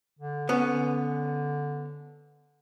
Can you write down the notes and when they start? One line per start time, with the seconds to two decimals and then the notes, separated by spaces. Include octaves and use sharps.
0.19 D3
0.49 D3 B3 C#4